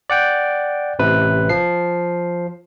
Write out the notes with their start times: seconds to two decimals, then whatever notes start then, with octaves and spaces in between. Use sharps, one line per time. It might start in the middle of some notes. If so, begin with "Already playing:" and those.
0.10 D5 F#5 G5
0.99 A1 C3 B4
1.49 F3 C7